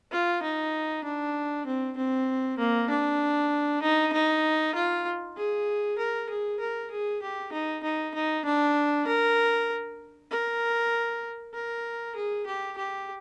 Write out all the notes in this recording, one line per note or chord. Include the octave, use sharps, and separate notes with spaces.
F4
D#4
D4
C4
C4
A#3
D4
D#4
D#4
F4
G#4
A#4
G#4
A#4
G#4
G4
D#4
D#4
D#4
D4
A#4
A#4
A#4
G#4
G4
G4